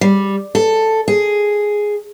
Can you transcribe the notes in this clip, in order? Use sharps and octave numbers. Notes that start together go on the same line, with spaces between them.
G3
A4
G#4